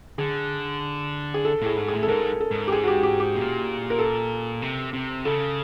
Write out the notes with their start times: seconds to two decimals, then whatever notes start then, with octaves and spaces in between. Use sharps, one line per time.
0.18 D3 G#4
1.34 G#4
1.45 A4
1.62 A2 G#4
1.77 G#2
1.88 A2 G#4
2.03 A4
2.08 G#2 A#4
2.40 A4
2.51 G#2
2.68 G4
2.72 G#4
2.84 F#4
2.88 G4
3.03 G4
3.20 G4
3.36 A#2
3.90 A#4
3.99 A4
4.62 C3
4.93 C3
5.25 C#3 A4